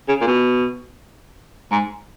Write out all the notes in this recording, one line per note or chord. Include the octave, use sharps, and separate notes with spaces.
C#3
A#2
B2
G#2